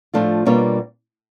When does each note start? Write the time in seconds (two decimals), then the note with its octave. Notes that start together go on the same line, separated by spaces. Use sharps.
0.14 A2 F3 A3 D4 F4
0.46 B2 G3 A#3 D4 F4 C#5